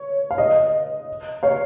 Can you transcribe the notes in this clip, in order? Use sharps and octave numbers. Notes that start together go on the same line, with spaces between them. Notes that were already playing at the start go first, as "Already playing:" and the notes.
Already playing: C#5
F5
D#5
C#5 F5